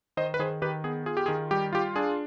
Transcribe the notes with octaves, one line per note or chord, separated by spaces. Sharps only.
D#3 C5 D#5
B4
D#3 G#4 C5
D#3 G4 B4
B3 G#4
F4 G#4
G4
D#3 G#4
G3 G4
F4 G4
D4 G#4